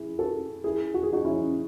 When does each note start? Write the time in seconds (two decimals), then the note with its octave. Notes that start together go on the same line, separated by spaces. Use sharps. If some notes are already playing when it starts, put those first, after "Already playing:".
Already playing: E4 G#4
0.19 F#4 A4
0.64 E4 G#4
0.94 F#4
1.03 G#4
1.13 D#4 F#4
1.25 C#4 E4